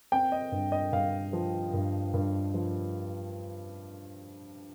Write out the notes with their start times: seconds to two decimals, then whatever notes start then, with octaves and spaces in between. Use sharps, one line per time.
0.12 C4 G5
0.32 D#5
0.52 G2
0.72 D#5
0.92 G2 F5
1.33 F3
1.73 G2
2.14 G2
2.54 F3